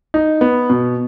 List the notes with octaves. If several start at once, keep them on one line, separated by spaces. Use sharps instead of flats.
D#4
B3
B2